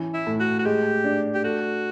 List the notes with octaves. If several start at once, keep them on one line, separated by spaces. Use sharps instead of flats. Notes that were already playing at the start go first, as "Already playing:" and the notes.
Already playing: E3 C#4
E4
A2
F#4
F#4
G#3 G4
D4
G4
A3 F#4